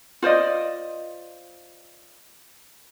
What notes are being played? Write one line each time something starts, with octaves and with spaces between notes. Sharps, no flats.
F4 C5 D5 D#5